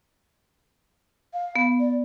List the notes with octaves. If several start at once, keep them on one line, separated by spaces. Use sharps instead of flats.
F5
B3
D5